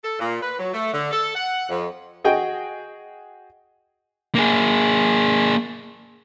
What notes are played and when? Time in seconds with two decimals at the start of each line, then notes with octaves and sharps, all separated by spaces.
0.04 A4
0.20 A#2
0.42 B4
0.58 F#3
0.73 A3
0.94 D3
1.11 A4
1.35 F#5
1.70 F2
2.24 F#4 G#4 D#5 G5
4.35 A#3 G#4